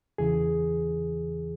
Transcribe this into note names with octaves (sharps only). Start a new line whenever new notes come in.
E2 C#3 E3 G#4